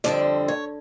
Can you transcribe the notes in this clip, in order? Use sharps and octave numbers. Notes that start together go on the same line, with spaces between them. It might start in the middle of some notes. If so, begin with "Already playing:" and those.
F2 D3 G3 C4 D5
C#5